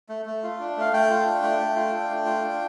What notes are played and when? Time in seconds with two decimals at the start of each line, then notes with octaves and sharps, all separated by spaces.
0.09 A3
0.26 A3
0.43 F4
0.60 D4
0.77 A3 F5
0.93 A3 G5
1.10 F4
1.26 D4
1.42 A3
1.59 A3
1.76 F4
1.93 D4
2.10 A3
2.26 F4
2.43 D4